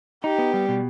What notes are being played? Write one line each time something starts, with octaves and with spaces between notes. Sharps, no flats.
D#4 G4
B3
G3
B2